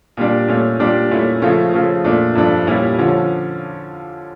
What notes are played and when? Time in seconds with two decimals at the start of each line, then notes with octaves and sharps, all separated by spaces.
0.17 A#2 G3 D4
0.48 A#2 A3 C#4
0.79 A#2 G3 D4
1.11 A#2 A3 C#4 E4
1.42 C#3 F3 A3 C#4
1.73 C#3 F3 A3
2.04 A#2 A3 D4
2.35 G2 F3 A3 D4
2.67 A#2 G3 C#4 E4
2.98 D3 F3 C#4